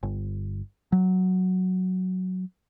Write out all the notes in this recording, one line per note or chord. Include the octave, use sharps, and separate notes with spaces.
G1
F#3